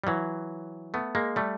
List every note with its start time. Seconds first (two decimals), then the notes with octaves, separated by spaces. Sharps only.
0.04 G3
0.07 E3 F#3
0.94 A3 B3
1.15 G#3 A#3
1.36 G3 A3